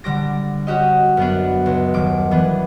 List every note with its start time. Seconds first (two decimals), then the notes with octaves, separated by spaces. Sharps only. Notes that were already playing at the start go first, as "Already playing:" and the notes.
0.04 D3 G3 D6 A#6
0.67 C#4 F#4 G4 D#5
1.17 F#2 B3 D4
1.66 C#2
1.94 D#1 D6
2.31 E3 B3 D4